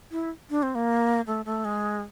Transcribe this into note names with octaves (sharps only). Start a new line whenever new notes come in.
E4
D4
C4
A#3
A3
A3
G#3